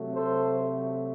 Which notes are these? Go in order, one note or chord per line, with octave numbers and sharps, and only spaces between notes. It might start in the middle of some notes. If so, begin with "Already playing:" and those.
Already playing: C3 F#3 A3
A4 C5